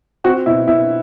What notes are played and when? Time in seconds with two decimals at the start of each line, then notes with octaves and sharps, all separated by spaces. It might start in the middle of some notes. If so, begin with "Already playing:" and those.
0.24 C4 F#4
0.46 B2 E4
0.68 B2 E4